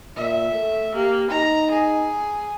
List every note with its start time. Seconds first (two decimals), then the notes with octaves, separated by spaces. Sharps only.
0.17 A#2 E5
0.53 A3
0.95 A#3 G4
1.30 D#4 A#5
1.71 G#4